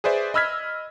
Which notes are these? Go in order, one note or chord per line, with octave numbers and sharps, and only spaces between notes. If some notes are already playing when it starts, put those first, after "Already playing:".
G#4 B4 C5 D5 E5
D#5 B5 E6 F6 G#6 B6